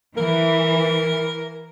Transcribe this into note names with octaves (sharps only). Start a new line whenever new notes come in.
E3 A#4